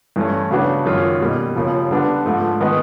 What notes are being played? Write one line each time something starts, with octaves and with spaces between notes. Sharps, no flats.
G2 E3 A3 C#4
C#3 F#3 B3 D4 F#4
F#2 D#3 G#3 C#4 F4
B2 G3 A#3
D#2 C#3 F3
D3 G3 B3 D4
G#2 F3 A3
D#3 G#3 B3 D#4